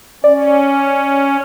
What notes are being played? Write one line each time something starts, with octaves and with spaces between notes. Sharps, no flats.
C#4 D5